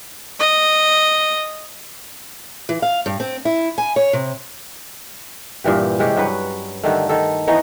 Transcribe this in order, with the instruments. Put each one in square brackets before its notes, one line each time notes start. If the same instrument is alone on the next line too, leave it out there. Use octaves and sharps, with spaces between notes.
[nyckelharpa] D#5
[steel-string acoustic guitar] E3
F5
G2
C4
E4
G#5
C#5
C3
[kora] G2 A#2 E3 G4
C3 G#3 C#4 G4
G2 F#3 F#4 B4
G2 D3 D#3 A3
D#3 A4
E3 B3 D#4 C#5